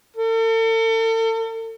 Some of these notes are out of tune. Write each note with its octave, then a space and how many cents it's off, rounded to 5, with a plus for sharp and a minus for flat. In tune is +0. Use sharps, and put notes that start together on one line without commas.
A4 +40